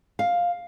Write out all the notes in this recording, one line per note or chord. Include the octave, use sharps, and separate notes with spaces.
F5